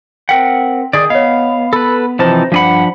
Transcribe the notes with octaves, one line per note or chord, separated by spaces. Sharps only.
C4 A#4 F#5 G5 B6
D#3 G#4 D5
B3 C#5 D#5 F5
A4 B4 B5
C3 E3 F3 D#4 C5 A5
G2 F3 D4 G#4 F#5 B5